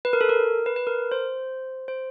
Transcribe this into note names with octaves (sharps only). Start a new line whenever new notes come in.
B4
A#4
A4
A#4
B4
B4
A#4
C5
C5